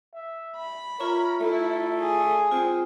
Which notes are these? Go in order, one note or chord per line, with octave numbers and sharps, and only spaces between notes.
E5
B5
F4 A#4 C#5 E5 A#5
A3 E4 A4
G#4
C4 F4